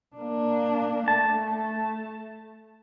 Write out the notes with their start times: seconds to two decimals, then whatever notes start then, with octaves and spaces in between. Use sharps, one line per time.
0.16 A#3 D4
1.08 A3 A5